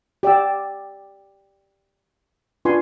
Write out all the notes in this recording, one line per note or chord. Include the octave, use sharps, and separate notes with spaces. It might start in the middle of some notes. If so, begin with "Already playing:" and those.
G4 D5 F#5 E6
D4 F4 B4 G#5 C6 C#6